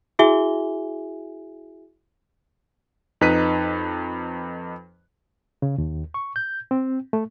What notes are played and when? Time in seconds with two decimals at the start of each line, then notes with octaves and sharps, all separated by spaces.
0.19 E4 F#4 G#4 E5 G#5 G7
3.21 F2 D#4 B4 F#6 B6 D#7
5.62 C#3
5.78 D#2
6.14 C#6
6.36 G6
6.71 C4
7.13 A3